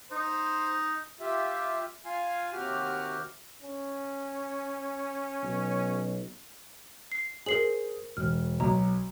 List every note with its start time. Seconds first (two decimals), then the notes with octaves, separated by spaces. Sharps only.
0.12 D#4 C5
1.20 F4 G4 E5
2.05 F4 F5 G#5
2.53 D#2 C3 F#4 G4 F6
3.62 C#4
5.43 B1
7.12 C7
7.46 G#4 A#4 C5 C7 F#7
8.17 E1 F6
8.60 B1 A#5